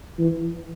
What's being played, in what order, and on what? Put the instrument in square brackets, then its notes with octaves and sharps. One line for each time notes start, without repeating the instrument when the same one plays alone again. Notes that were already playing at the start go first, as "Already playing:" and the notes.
[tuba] E3